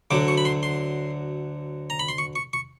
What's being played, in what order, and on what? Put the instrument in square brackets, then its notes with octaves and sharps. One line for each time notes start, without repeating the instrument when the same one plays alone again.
[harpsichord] D2 D3 F#3 D6
C#6
B5
C6
C6
A#5
B5
C6
C#6
C#6
C#6